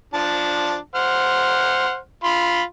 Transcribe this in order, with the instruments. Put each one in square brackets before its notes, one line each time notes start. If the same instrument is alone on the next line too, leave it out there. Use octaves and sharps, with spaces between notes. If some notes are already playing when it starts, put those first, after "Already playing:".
[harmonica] F3 D4 A5
C5 F#5 F6
F4 B5 C6